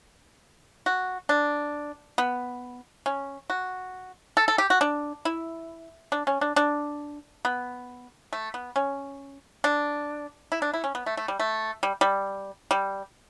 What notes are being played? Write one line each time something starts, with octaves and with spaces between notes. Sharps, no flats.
F#4
D4
B3
C#4
F#4
A4
A4
G4
F#4
D4
E4
D4
C#4
D4
D4
B3
A3
B3
C#4
D4
E4
D4
E4
C#4
B3
A3
A3
G3
A3
G3
G3
G3